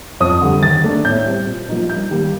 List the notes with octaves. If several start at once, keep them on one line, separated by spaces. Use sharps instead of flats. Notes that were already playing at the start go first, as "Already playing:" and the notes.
F2 D#6
D3 G3
D#3 A6
A3 D4
A2 G6
G3 C4
A#2
F3 A#3 D#4
G2 G6
D#3 G3 A#3